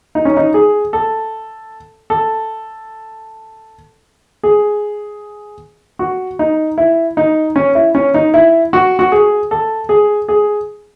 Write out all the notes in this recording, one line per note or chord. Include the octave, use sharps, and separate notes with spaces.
D#4
C#4
D#4
G#4
A4
A4
G#4
F#4
D#4
E4
D#4
C#4
E4
C#4
D#4
E4
F#4
F#4
G#4
A4
G#4
G#4